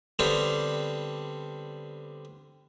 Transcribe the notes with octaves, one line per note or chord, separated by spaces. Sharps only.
D3 G3 B3 C4 D4